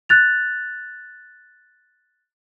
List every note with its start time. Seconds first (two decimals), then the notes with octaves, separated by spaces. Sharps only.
0.09 F#6 A6 F7